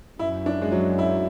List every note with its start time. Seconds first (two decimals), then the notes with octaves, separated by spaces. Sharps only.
0.19 F#2 E4
0.46 D4
0.61 G#3
0.72 F#3
0.98 E4